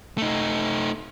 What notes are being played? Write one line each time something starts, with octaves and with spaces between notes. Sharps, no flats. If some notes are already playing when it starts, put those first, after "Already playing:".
A3 D#4